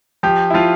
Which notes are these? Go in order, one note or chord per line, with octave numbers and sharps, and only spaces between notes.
F3 G4
E4
F3 F4